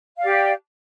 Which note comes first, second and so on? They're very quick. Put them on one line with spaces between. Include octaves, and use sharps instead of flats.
F5 D5 G4